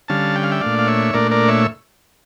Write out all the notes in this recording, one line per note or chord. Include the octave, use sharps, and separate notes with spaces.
D3 G3 C#4 F5 A5
G5
F5
E5 G5
A#2 A3 D4 D5 F5
F5
C#5 E5
A#2 A3 D4 A#4 D5
A#4 D5
C#5 E5